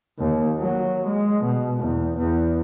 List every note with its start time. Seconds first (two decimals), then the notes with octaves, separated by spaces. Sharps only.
0.18 D#2
0.59 F#3
1.07 G#3
1.45 B2
1.80 E2
2.17 E2